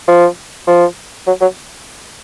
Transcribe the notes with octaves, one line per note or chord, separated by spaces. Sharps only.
F3
F3
F#3
F#3